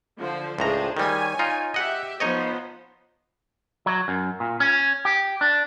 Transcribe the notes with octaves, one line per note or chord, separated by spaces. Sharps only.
D3 F3 C5
C#2 A2 D4 G#4 C5 A#5
D#3 G3 C#5 G#5
D#4 F4
G4 D#5 E5 F#5
F3 B3 D#4 C5 C#5 D#5
F#3
F#2
A#2
C#4
G4
D4